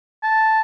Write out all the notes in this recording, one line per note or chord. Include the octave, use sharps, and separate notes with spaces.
A5